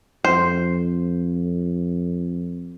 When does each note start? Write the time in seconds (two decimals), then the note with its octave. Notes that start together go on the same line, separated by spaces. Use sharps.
0.25 F2 C5